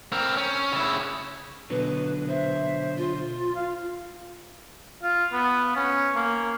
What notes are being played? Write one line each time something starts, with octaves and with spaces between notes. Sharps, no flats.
C4 A#4
C#4
C#3 E4
B2 D3 F#3 B4
C5 E5
F4
F5
F4
B3
C#4
A#3